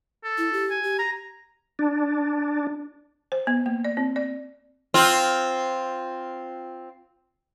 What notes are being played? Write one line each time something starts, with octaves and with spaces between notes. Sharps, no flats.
A4
E4
G4
G#5
G4
A#5
D4
C5
B3
A#3
D5
C4
D5
C4 F4